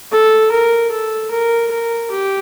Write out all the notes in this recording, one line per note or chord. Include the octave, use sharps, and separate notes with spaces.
A4
A#4
A4
A#4
A#4
G4